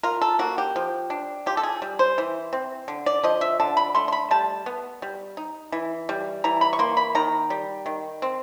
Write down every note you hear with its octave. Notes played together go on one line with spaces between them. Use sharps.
F4 A#4
A4
A#3 F#4
G4
F3
D4
F4 G4
A4
G#4
G3
C5
E3
C4
D3
D5
F3 D#5
E5
D3 A5
B5
A3 C6
C6
B5
G3 A5
B3
G3
D#4
E3
G3
E3 A#5
B5
C#6
A#3 C6
B5
D#3 A#5
G3
D#3
C4